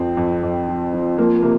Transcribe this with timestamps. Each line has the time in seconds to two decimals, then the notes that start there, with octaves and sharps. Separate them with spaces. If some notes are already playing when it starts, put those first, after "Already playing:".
Already playing: F2 F3 C4
0.17 F2
0.43 F2
0.68 F3
0.93 F3
1.17 F3 A#3
1.42 C3 A#3